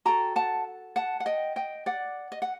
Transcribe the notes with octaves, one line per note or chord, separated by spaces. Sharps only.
F#4 A4 G5 A#5
F#5 A5
F#5 A5
F#5
D#5 G5
D#5 G5
D5 F#5
D#5
F#5